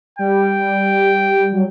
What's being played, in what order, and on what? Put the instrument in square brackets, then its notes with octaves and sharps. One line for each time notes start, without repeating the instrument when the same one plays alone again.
[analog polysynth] G3 [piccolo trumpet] G5
[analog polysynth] F#3